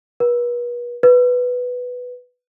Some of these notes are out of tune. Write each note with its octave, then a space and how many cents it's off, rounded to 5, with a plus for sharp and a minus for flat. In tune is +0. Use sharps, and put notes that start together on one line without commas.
B4 -40
B4 +0